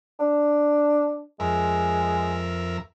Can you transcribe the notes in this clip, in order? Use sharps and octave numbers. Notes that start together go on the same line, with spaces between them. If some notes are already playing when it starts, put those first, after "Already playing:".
D4
F2 G#3 A#4 E5